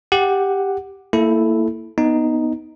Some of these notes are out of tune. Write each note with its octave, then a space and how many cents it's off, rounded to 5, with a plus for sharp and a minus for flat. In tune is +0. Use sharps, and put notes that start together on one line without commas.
G4 +5 F#5 +0
A#3 -25 E4 +0 A4 -10
B3 +0 D#4 +0